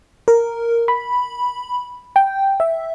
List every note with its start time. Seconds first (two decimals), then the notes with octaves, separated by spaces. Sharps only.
0.28 A#4
0.88 B5
2.16 G5
2.60 E5